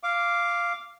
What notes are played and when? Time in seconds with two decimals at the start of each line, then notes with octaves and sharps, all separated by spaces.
0.03 F5 D6